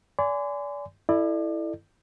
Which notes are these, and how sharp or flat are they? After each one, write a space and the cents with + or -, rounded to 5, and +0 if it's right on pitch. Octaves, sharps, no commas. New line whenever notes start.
D5 -30 G#5 +0 C6 -40
E4 +0 A4 +0 D5 +35